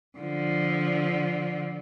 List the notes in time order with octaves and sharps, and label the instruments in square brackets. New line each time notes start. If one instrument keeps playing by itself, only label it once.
[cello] D3 F3